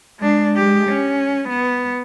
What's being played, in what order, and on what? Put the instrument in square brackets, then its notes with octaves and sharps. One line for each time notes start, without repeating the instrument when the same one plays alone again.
[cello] G#3 D4
G#3 G4
C#4
B3